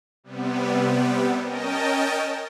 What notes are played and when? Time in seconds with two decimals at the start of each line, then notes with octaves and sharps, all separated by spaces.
0.24 C3 G3 B3
1.41 C#4 A#4 D#5 G5 A5